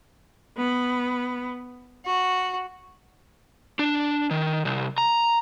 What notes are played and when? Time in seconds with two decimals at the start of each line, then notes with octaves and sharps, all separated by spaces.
0.56 B3
2.05 F#4
3.79 D4
4.31 D#3
4.65 C2
4.98 A#5